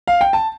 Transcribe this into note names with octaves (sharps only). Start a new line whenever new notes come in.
F5
G5
A5